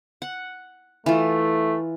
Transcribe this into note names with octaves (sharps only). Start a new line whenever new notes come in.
F#5
E3 A3 F4